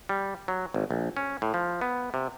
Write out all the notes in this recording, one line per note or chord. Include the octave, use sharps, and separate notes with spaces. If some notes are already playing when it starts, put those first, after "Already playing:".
G3
F#3
G#1
A#1
C#4
A2
F3
B3
C3